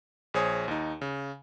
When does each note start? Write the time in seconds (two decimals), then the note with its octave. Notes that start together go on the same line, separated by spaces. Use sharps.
0.34 A#1 G#4 C5 C#5 G#5 D#6
0.68 D#2 D#4
1.01 C#3